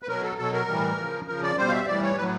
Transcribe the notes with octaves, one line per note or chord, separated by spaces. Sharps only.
B4
B2 F#3 A#4
A4
B2 F#3 A4
A#4
A2 E3 G3
C#3 F3
C#3 F3 A#4
D5
B2 G3 C5
F5
E5
A2 E3 G3 D5
C#5
A2 F#3 B4